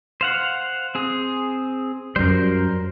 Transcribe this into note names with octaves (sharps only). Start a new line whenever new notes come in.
C5 F5 F#5
C4 G#4
F#2 G3 A#4 C5